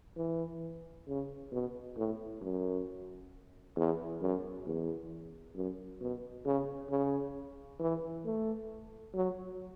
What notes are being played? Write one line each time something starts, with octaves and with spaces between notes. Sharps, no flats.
E3
C#3
B2
A2
F#2
E2
F#2
E2
F#2
B2
C#3
C#3
E3
A3
F#3